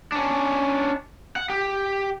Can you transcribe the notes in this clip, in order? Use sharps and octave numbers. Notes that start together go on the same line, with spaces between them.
C#4 D4
F#5
G4